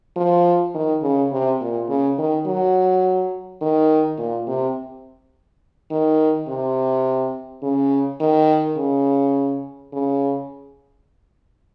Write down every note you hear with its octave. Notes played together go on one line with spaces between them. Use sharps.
F3
D#3
C#3
C3
A#2
C#3
D#3
F#3
D#3
A#2
C3
D#3
C3
C#3
D#3
C#3
C#3